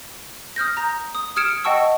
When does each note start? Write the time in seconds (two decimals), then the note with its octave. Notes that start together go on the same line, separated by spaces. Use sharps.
0.56 D#6 F6 G6 A#6
0.77 A#5 A#6
1.15 D#6
1.36 D#6 F6 G#6 C#7 D7 E7
1.64 D#5 F#5 G5 A5 C#6 E6